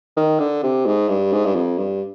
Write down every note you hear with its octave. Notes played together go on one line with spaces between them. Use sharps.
D#3
D3
C3
G#2
G2
G#2
G2
F2
G2